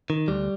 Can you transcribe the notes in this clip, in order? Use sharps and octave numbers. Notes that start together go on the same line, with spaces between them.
D#3
D2 G3